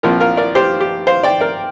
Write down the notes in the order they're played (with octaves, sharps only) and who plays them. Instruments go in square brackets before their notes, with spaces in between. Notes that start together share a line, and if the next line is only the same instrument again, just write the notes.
[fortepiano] A#1 A#2 F3 C4 F4 A#4
F4 A#4
A#4 D5
G4 C5
G4
C5 F5
D5 G5
A#4 D5